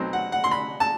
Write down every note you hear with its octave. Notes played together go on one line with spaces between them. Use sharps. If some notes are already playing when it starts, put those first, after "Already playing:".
Already playing: B1 B2 F#3 C4
F#5
F#5
C6
B5
A5